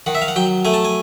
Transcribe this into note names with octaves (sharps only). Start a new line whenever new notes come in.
D#3 F#5
E5
F5
F#5
F#3 G5
A3 G#5
A5
G#5